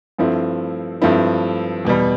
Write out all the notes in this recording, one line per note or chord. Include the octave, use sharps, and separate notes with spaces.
G2 F3 A3 C4 E4
G2 F3 A3 C4 E4
E2 B2 G3